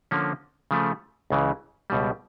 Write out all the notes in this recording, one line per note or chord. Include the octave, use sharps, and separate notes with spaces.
D3 F3 A#3 C#4
C#3 F3 A3
C#2 C#3 E3
C#2 B2 G3